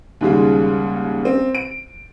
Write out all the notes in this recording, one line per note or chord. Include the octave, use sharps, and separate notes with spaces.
D#2 G#2 C#3 G3 G#3
C4
D7